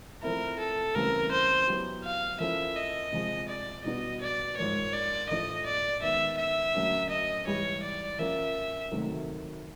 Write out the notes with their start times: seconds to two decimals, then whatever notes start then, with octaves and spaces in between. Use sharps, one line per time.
0.23 F3 A3 C4 E4 A#4
0.59 A4
0.95 D2 C#3 E3 G3 C4 A#4
1.32 C5
1.68 F#3 B3 E4 G4
2.04 F5
2.40 F3 A#3 C#4 E4 A4 E5
2.76 D#5
3.13 C3 F3 G#3
3.48 D5
3.84 B2 G3 B3 D4 F#4 D#5
4.21 D5
4.57 G#2 F3 A#3 C#5
4.93 D5
5.29 A2 F3 A3 D4 D#5
5.66 D5
6.02 D#3 G#3 B3 E5
6.38 E5
6.74 D2 D3 F#3 A#3 C#4
7.10 D#5
7.47 G#2 E3 G3 C#5
7.83 D5
8.19 F3 A#3 C#4 F4 A#4 E5
8.92 D2 C3 D#3 F#3 A3